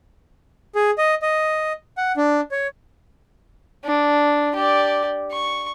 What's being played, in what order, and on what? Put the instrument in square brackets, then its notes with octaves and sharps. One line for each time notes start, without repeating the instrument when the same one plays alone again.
[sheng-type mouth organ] G#4
D#5
D#5
F#5
D4
C#5
[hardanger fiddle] D4
G4 D5
C#6